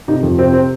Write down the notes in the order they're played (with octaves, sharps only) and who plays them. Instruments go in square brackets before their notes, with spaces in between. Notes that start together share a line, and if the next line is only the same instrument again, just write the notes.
[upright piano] C3 D#4
F2
C3 C4
C4